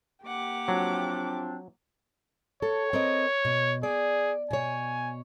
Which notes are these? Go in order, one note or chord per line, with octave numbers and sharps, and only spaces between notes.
A#3 G4 F#5 D6
F3 F#3 C4 D4
A4 C#5
C4 A#4 D#5
B2
G#4 D5
B2 C#5 G#5